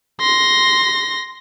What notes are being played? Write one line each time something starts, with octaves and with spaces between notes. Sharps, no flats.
C6 A#6